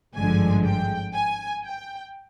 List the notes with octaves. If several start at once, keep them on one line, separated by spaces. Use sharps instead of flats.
G#1 G2 D3 F3 G#3 G#5
G5
G#5
G5